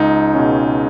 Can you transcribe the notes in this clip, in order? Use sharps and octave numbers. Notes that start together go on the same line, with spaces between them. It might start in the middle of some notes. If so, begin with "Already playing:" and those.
Already playing: C#2 D#4
B2 G#3 C#4